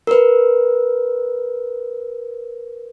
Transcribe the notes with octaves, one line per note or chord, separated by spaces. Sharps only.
A#4 B4